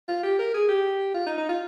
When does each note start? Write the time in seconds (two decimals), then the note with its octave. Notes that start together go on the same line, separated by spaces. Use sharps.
0.08 F4
0.23 G4
0.39 A#4
0.54 G#4
0.69 G4
1.14 F4
1.26 D#4
1.38 D#4
1.49 F4